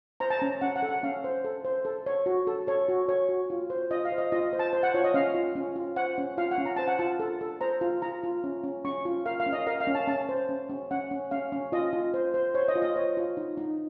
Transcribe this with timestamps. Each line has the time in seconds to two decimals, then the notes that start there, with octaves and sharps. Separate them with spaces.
0.20 C5 A#5
0.30 A5
0.39 C#4 A#5
0.61 C#4 F#5
0.76 F#5
0.83 A4
0.89 F#5
1.03 C#4 F5
1.24 C5
1.45 A4
1.65 C5
1.85 A4
2.06 C#5
2.26 F#4
2.47 A4
2.67 A4 C#5
2.89 F#4
3.09 C#5
3.29 F#4
3.50 F4
3.70 C5
3.91 F4 D#5
4.05 F5
4.12 C5
4.18 D#5
4.32 F4 D#5
4.53 C5
4.59 A5
4.73 C5
4.83 F#5
4.94 F4 C#5
5.04 D#5
5.14 C#4 F5
5.34 F4
5.55 C#4
5.76 F4
5.96 C5 F#5
6.18 C#4
6.38 F4 F5
6.51 F#5
6.58 C#4
6.66 A#5
6.76 C5 A5
6.88 F#5
6.99 F4 A5
7.20 A4
7.41 A4
7.61 C5 A#5
7.81 F4
8.02 F4 A#5
8.24 F4
8.44 C#4
8.64 C#4
8.85 C#4 C#6
9.05 F4
9.26 A#4 F5
9.40 F5
9.46 C#4
9.53 D#5
9.67 A#4 F5
9.81 F5
9.87 C#4
9.95 A5
10.08 C#4 A5
10.29 C5
10.49 C#4
10.69 C#4
10.91 C#4 F#5
11.11 C#4
11.31 C#4 F5
11.52 C#4
11.72 F4 D#5
11.93 F4
12.14 C5
12.34 C5
12.55 C5 C#5
12.68 D#5
12.75 F4
12.82 D#5
12.96 C5 C#5
13.17 F4
13.37 D#4
13.57 D#4